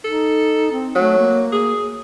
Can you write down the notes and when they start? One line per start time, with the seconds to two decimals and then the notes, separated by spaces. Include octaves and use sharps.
0.04 D#4 A4
0.72 C4
0.95 F#3 A3
1.19 A#3
1.52 G#4